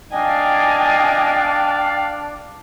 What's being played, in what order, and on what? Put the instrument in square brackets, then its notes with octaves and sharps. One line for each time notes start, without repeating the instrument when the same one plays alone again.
[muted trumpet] D4 [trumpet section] D5 F5 [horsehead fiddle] D#5 G#5 [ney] G5